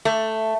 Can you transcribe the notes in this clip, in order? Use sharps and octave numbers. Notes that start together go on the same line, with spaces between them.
A3